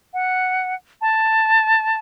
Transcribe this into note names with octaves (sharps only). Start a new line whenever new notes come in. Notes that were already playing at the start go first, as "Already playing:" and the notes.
F#5
A5